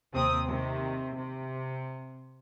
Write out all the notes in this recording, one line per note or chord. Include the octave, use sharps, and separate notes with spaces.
D#2 C3 C4 D#6
C3 D#3
C3